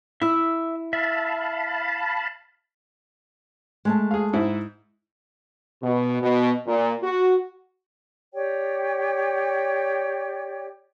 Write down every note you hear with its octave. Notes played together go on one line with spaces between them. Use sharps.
E4 E5 E6
E5 F5 A5 B5
G#3 A3 A5
G#4 F5
G#2 E4 E5
B2
B2
A#2
F#4
G4 C#5 D5 G5